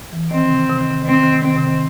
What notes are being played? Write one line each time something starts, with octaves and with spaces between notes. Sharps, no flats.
E3
D#3 C4
C3
C3
D#3
C3
D#3 C4
C3
D#3
C3
D#3 C4
C3
D#3